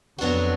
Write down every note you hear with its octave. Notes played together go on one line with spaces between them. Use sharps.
F2 F#3 B3 D4 F#4